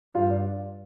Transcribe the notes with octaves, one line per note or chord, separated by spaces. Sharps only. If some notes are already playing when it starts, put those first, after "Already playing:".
G2 F4 F5
D4 D5